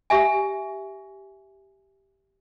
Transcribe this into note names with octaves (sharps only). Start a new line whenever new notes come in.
G4 E5 G#5